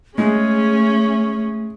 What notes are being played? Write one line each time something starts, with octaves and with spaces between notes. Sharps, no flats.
G#3 A3 C#4 G#4